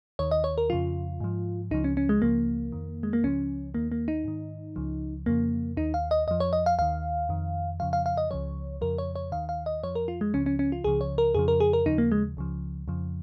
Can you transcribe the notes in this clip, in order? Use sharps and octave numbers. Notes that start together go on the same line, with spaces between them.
D#2 D#3 C#5
D#5
C#5
A#4
F2 C#3 F3 F4
G#2 F3
C#2 C#3 F3 D#4
C#4
C#4
G#3
C#2 C#3 F3 A#3
F2 D#3
G#3
A#3
C#2 C#3 F3 C#4
D#2 D#3 A#3
A#3
D#4
G#2 D#3
C#2 C#3 F3
F2 C#3 F3 A#3
D#2 D#3 D#4
F5
D#5
F2 F3 D#5
C#5
D#5
F5
D#2 D#3 F5
F2 D#3
F2 C#3 F3 F5
F5
F5
D#5
C#2 C#3 F3 C#5
F2 C#3 F3 A#4
C#5
C#5
D#2 D#3 F5
F5
D#5
F2 F3 C#5
A#4
F4
G#3
C#2 C#3 F3 C#4
C#4
C#4
F4
C#2 C#3 F3 G#4
C#5
A#4
F2 C#3 F3 G#4
A#4
G#4
A#4
D#2 C#3 F3 D#4
A#3
G#3
C#2 C#3 F3
F2 C#3 F3